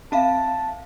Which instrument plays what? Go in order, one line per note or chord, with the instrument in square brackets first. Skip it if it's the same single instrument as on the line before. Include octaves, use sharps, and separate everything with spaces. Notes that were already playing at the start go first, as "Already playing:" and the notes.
[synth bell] C4 E5 F5 [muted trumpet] A5